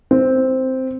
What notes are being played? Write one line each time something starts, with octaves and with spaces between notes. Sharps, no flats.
C4